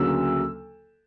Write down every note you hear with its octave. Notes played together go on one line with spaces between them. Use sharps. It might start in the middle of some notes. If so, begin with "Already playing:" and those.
Already playing: D2 C#3 F#3 A#3 E6